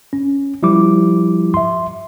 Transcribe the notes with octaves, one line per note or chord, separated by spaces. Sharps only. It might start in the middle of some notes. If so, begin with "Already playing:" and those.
C#4
F3 G3 E4 G4 D6
E5 C6